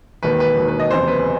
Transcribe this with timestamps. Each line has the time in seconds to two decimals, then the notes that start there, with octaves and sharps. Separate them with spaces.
0.23 E1 D#2 D#3 B4
0.40 B4
0.57 E1 D#2 D#3
0.68 B4
0.80 D#5
0.91 F#1 E2 C3 C5
1.08 B4